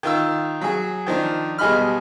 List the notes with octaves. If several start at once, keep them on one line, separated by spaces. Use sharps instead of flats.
D#3 F4 E6
F#3 G#4
D#3 F3 D4
B1 G3 G#4 D#5 B5 F6